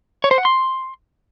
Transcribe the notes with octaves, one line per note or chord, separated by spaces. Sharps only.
C#5
C5
F#5
C6